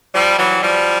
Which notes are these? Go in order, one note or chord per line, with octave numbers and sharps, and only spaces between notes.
F3 G3
E3 F#3
F3 G3